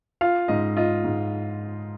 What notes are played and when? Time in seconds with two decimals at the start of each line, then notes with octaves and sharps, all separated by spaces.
0.21 F4 F5
0.48 G#2 D#5
0.77 F4 D#5
1.04 G#2